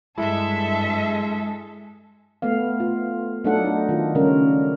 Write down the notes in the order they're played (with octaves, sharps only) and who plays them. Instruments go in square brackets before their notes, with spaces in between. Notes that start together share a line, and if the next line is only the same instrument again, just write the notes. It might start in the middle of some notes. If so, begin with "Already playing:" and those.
[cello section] G2 E5 [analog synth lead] G#3 [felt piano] E4 [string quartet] A4
[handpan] A3 B3 F5
F4
F#3 A3 D4 D#4 A4 F#5
D#4
D#3 F4
C#3 G3 C#4 A#4